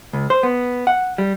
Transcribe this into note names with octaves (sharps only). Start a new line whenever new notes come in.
C#2
C5
B3
F#5
G3